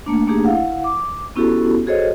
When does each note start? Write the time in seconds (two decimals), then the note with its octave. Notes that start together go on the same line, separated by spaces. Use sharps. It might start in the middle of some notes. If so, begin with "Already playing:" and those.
0.06 A3 A#3 D4
0.27 A3 A#3 D4 D#4 G4 G#4
0.44 E4 F5 F#5
0.84 D6
1.36 B3 C#4 E4 F#4 G4 A4
1.86 F#4 G#4 A4 C5 C#5 D#5